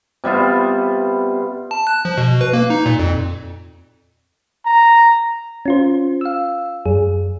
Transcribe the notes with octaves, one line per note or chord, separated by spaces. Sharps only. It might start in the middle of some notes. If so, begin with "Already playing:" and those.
C3 G3 B3 F4
A5
F#6
F3
B2
B4
A#3
D#4
A#2
F2
A#5
C#4 F4 C5
F5 E6
F#2 G#4